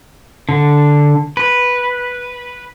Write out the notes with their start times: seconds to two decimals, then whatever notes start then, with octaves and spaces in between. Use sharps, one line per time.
0.49 D3
1.37 B4